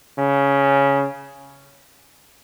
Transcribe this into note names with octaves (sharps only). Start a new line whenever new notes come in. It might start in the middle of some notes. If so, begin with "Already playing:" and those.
C#3